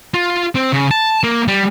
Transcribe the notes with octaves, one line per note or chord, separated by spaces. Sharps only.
F4
C4
C#3
A5
A#3
G3